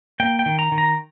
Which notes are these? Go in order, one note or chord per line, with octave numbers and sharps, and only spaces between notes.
A#3 G5
G5
D#3
A#5
D#3
A#5